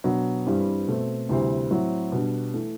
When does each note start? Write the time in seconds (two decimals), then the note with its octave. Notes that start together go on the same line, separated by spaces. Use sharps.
0.04 B2 F#3 B3 D4
0.46 G2 E3 G3 C4
0.87 B2 A3 C4
1.29 D2 C3 E3 G3 C4
1.70 A2 F#3 C4 E4
2.12 B2 G3 D4
2.54 E3 A3